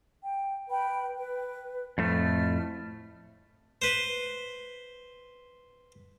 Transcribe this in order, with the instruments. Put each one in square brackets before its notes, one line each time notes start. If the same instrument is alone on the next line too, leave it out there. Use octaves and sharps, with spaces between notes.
[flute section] G5
B4 G5 B5
B4
[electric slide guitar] F2 A2 A3 [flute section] F6
[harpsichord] B4 C5